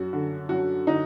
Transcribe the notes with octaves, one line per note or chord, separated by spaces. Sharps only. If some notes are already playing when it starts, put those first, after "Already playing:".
Already playing: F#2 F#4
D3
F#2 F#4
D3 D#4